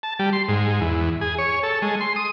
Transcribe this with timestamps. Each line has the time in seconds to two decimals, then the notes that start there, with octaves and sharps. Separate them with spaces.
0.03 A5
0.19 G3
0.33 C6
0.49 G#2
0.81 E2
1.21 G#4
1.38 C#5
1.63 A4
1.82 G#3
2.01 C6
2.16 D#6